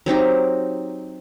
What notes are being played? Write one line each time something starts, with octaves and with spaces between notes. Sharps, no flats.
F#3 C4 D#4 G4